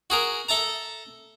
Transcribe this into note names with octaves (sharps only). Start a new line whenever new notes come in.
F#4 G#4 A#4
A4 E5 A5 A#5